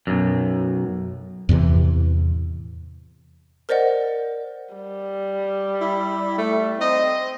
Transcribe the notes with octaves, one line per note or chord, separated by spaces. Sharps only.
B1 F#2
E2 A2 C3 E3
A#4 C5 D5 D#5 F#5
G3
E4
A3
C4 D#5